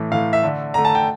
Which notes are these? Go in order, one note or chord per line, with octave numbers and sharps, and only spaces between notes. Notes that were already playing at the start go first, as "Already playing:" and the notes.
Already playing: A2 E3 A3
A2 E3 A3 F5
E5
D3 A3
D3 A3 A#5
A5
G5